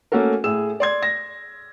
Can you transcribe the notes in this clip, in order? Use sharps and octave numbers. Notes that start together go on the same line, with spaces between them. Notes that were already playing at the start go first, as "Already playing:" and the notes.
A3 A#3 C#4 F#4 A4 A#4
A2 G#4 E6 E7
D5 C6 G#6
A#6